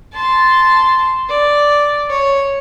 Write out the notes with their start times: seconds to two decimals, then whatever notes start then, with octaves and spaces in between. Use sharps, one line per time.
0.14 A5 C6
1.29 D5
2.10 C#5